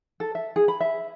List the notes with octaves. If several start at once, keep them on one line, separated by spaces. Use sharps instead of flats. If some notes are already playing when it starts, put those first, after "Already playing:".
A4
E5
G#4
B5
E5